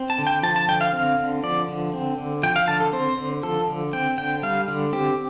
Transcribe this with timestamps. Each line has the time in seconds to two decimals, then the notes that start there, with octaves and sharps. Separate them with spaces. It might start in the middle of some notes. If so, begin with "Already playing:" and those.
Already playing: C4
0.10 A5
0.18 D3
0.27 G5
0.43 F3 A5
0.56 A5
0.68 D3 G5
0.81 F5
0.93 C4
1.18 D3
1.43 F3 D5
1.68 D3
1.93 C4
2.18 D3
2.43 F3 G5
2.56 F5
2.68 D3 A5
2.80 A4
2.93 C4 C5
3.18 D3
3.43 F3 A4
3.68 D3
3.93 C4 G5
4.18 D3 G5
4.43 G3 F5
4.68 D3
4.93 C4 G4